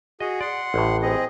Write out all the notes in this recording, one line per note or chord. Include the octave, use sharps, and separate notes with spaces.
F#4 G#4 D#5
D5 F#5 C6
A1 A2
C4 G#4 D#5